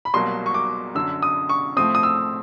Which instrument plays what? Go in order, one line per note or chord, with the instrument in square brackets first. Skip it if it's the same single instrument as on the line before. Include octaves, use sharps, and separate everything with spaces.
[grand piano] B5
C2 B2 F#3 A#3 C6
C#6
D6
F#2 D3 F#3 E6
D#6
C#6
A2 F3 A3 C4 D#6
D#6
E6